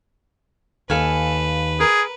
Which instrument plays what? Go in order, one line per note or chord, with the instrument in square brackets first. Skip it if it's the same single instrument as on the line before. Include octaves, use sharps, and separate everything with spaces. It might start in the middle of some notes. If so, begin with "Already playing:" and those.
[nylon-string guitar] D#2 [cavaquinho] A4 F5 G#5 [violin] B4
[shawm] G#4 [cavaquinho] A#4